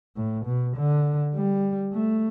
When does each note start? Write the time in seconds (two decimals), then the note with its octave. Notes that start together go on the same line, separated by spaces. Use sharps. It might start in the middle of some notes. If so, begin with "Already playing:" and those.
0.16 A2
0.46 B2
0.76 D3
1.35 G3
1.93 A3